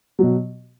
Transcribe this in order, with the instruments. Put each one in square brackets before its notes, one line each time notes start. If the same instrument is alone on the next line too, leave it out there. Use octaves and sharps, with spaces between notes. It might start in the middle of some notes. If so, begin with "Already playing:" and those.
[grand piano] B2 F#3